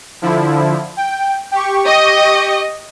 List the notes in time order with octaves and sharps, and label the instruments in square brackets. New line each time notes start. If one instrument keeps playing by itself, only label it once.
[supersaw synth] D3 F3 E4
G5
G4 C#6
[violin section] D#5